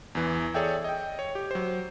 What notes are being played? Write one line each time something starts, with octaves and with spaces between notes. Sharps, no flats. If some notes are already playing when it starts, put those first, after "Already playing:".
E2 E3
G#4 A4 C#5 D5 E5 G5
D#5 G5
C#5
G4
F#3 C5